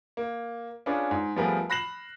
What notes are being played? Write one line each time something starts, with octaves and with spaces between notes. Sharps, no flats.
A#3
C#4 D4 F4 G#4 B4 D5
G#2
F3 G3 A3 B3 G#4 A#4
B5 F#6 A#6 C7 E7 F#7